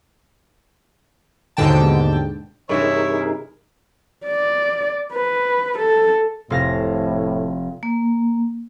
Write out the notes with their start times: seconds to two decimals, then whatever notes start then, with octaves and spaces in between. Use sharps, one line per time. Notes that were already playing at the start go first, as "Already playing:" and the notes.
1.57 D#2 G#2 B2 D3 G5 A5
2.69 G2 C3 E3 D#4 E4 G#4 A#4 C#5
4.26 D5
5.13 B4
5.78 A4
6.50 F1 A2 F5 A#6
7.83 A#3